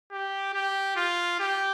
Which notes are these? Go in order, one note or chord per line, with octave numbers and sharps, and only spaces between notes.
G4
G4
F4
G4